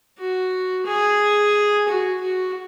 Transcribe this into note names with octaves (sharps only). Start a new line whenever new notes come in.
F#4
G#4
F#4
F#4